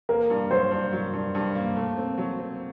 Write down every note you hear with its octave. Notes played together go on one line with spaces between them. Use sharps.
A#3 A#4
G2
F#3 C5
G2
F#3
G2
G2
A#3
A3
C4
F#3
C4